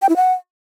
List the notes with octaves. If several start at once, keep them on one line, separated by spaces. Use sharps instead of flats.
G5
E4
F#5